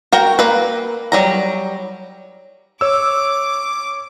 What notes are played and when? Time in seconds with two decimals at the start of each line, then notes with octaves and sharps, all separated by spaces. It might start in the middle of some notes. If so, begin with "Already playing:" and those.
0.12 F#4 A#4 G5
0.39 A#3 B4
1.12 F#3 G3 A#5
2.81 C#5 D6 E6